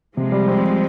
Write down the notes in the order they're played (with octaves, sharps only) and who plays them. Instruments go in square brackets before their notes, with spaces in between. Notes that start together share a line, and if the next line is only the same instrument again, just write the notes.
[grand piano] C3 [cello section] F3 G#3
[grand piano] G3
C4
G3